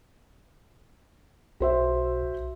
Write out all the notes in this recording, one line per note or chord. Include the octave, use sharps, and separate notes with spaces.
B1 F#4 C5 E5